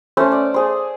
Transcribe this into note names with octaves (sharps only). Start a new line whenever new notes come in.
A3 C#4 C5
D5
G#4 C5